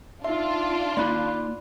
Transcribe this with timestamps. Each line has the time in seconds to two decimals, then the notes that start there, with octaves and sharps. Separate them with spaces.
0.25 D4 D#4 F4 E5 C6
0.97 A#3 D#4 D5 B5 F#6